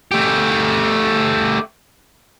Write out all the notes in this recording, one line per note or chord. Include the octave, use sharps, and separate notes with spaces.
A3 G4